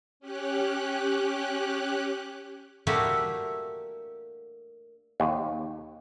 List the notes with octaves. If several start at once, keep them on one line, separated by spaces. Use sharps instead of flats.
C#4 G4 F#6
A3 A#3 D4 E4 F#4 G4
D#2